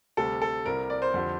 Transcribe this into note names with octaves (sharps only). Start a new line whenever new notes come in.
D2 C3 G3 A4
A4
C2 C3 G3 A#4
D5
C5
F2 D3 G3